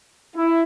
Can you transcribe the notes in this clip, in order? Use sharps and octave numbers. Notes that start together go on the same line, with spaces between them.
E4